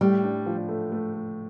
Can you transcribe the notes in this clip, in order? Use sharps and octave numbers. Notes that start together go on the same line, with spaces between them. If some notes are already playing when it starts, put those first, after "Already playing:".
A2 G3
D4
F3
A3
A3
A3